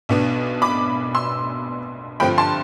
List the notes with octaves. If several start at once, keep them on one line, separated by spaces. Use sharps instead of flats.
B1 B2 B3 D4
B5 D6
C6 E6
G2 D3 F3 C4 G5 B5
A5 C6